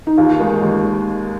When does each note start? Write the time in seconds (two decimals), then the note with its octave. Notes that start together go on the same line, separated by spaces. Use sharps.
0.07 D#4
0.17 D#2 F4
0.40 D#3 G#3 D#4
0.62 D#2